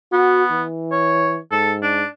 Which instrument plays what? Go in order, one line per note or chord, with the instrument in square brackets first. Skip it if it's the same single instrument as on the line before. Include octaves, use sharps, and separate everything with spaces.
[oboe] B3 [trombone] F#4
[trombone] E3
[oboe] C#5
[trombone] G#2 [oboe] A4
[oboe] D4